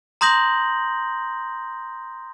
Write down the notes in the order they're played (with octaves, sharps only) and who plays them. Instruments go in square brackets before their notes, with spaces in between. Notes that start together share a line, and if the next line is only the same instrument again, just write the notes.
[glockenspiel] A#5 C6 D#6 G6 A#6 F#7